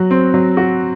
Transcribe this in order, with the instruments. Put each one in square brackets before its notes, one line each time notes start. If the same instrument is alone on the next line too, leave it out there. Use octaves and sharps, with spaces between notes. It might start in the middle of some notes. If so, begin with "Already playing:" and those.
Already playing: [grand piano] F#3 F#4
C4
F#3
F#4